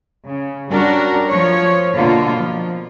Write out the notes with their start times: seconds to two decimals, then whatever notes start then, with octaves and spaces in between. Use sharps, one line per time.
0.28 C#3
0.71 G3 C#4 D4 F#4 A#4
1.29 F3 C#5
1.95 B2 D3 A#3 F4
2.36 F3